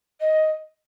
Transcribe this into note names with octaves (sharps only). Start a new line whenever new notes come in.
D#5